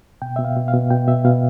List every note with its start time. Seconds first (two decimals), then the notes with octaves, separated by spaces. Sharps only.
0.22 B2 G5
0.36 B2 E5
0.45 F5
0.56 B2
0.68 F5
0.74 B2
0.90 B2 G5
1.07 B2 E5
1.25 B2 F5